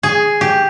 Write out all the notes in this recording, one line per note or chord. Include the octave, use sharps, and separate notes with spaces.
G#4
G4